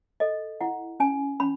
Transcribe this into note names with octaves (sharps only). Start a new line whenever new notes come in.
A4 D#5
E4 F#5
C#4 G#5
C#4 B5